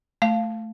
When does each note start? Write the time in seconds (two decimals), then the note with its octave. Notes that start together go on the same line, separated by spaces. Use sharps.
0.22 A3 F5